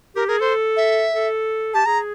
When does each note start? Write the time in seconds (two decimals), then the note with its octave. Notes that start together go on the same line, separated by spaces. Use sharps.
0.16 G4 A#4
0.28 G#4 A#4
0.40 A4 C5
0.77 E5
1.13 A4
1.74 G4 A5
1.86 G#4 A#5